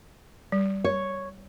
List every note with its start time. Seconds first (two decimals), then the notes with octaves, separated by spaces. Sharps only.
0.52 G3
0.84 C#5